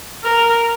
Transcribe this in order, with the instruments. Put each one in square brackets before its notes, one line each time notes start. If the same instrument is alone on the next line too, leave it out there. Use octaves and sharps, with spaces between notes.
[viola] A#4